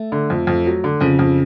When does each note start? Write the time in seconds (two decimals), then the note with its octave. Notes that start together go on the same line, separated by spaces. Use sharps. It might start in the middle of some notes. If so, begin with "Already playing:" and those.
Already playing: A3
0.12 D3
0.30 F2
0.47 F2
0.66 F#3
0.84 D3
1.01 F2 C#3
1.19 F2